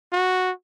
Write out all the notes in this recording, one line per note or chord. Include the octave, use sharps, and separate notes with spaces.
F#4